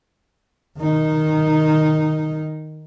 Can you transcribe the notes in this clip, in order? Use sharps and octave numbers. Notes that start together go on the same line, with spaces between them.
D#3 D#4